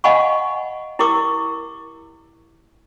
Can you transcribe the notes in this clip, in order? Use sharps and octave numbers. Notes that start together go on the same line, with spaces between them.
D#5 F5 F#5 G#5 B5 C#6
E4 G4 A#4 C#6 D6 E6